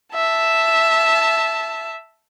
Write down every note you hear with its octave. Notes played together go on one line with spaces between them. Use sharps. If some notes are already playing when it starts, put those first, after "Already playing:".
E5 A5